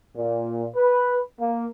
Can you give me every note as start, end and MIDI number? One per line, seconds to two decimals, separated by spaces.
0.16 0.66 46
0.76 1.18 71
1.39 1.66 58